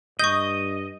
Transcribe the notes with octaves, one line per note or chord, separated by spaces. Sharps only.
G2 D#5 C#6 D#6 G6 A#6 D#7